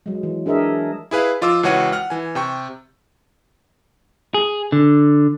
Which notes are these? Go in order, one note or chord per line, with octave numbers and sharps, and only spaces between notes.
F#3 G#3
E3
D4 G#4 A#4 D#5 E5
E4 G#4 B4 F5
F3 F4 D#5 D6 E6
C#2 E3 F#4 C#5 F#5 D#7
F#5 F6
E3 G#5
C3 G5 C#6
G#4
D3